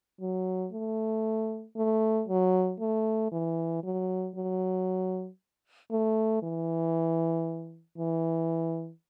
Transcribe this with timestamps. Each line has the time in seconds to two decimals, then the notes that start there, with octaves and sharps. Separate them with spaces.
0.21 F#3
0.73 A3
1.77 A3
2.28 F#3
2.80 A3
3.32 E3
3.84 F#3
4.35 F#3
5.91 A3
6.43 E3
7.98 E3